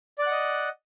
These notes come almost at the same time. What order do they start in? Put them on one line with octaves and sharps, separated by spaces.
D5 F#6 F#5 D#5